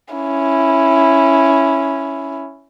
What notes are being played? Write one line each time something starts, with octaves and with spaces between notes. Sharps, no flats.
C#4 E4